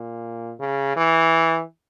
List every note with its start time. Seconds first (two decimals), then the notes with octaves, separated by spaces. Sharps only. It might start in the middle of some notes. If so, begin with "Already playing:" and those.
Already playing: A#2
0.59 C#3
0.96 E3